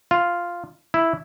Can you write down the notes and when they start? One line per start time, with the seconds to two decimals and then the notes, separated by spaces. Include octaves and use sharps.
0.11 F4
0.94 E4